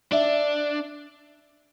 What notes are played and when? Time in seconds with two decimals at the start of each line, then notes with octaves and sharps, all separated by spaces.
0.12 D4 E5